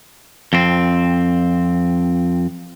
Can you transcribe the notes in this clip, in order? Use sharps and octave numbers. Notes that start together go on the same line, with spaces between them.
F2 C4